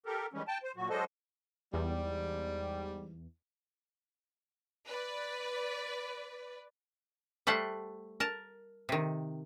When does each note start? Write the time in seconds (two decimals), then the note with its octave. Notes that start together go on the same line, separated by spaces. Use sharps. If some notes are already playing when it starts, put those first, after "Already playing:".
0.06 G4 A4 A#4
0.33 D#3 E3 G3 G#3 C#4
0.48 G5 A5
0.63 C5
0.76 A#2 F#3 F#4
0.90 F#3 G#3 D4 A4 C5 D#5
1.74 E2 G#2 G3
4.86 B4 D5
7.47 G3 A3 C5 F#5
8.20 A#4 A5
8.89 C3 D#3